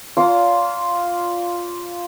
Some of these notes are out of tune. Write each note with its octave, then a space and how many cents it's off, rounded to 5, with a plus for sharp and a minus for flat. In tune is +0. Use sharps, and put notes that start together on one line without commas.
F4 +0 D5 -40 A#5 -45